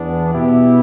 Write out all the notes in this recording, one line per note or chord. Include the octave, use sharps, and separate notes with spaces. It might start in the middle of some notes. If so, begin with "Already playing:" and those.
Already playing: E2 E3 B3 D4
B2 B3 E4 G4